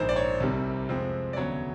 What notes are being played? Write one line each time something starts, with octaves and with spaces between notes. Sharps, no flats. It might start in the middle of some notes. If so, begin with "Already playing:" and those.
Already playing: A#1 G#2 D#3 C5
D5
C#5
C2 C3 D#3 G3 C4
F2 C3 F3 G#3 C4
D5
E1 D2 C#3 F#3 B3 C#5